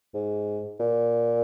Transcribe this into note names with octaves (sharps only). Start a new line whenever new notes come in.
G#2
A#2